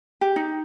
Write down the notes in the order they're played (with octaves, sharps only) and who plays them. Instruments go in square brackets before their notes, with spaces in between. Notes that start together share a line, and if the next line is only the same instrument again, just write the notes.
[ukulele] G4
D#4